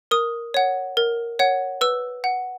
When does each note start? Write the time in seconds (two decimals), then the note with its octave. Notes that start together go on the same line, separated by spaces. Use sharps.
0.11 A#4 D#6
0.54 C#5 F#5
0.97 A#4
1.39 C#5 F#5
1.81 B4 E6
2.24 F#5